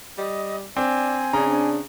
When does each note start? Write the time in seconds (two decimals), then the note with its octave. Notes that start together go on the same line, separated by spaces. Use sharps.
0.18 G3 D#5
0.77 C4 D4 G#5
1.33 C#3 C4 D4 A#5